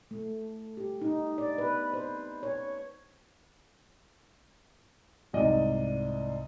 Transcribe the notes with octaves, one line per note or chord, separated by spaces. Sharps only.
A3
G4
D#4
D5
B4
C5
C#5
C2 G#2 D5 D#5